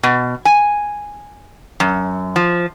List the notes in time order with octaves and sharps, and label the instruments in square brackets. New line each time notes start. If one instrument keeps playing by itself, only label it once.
[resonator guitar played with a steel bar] B2
G#5
F#2
F3